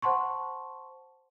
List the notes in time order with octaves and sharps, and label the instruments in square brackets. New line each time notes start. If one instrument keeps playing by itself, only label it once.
[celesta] C5 F#5 A5 C6 C#6